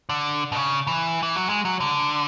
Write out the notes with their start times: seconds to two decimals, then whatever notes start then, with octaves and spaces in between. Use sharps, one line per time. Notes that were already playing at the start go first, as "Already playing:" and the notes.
0.09 D3
0.52 B2
0.56 C#3
0.87 E3
1.23 E3
1.36 F#3
1.49 G#3
1.65 F#3
1.80 D3